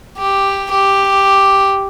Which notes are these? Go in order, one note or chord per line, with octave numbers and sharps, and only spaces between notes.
G4
G4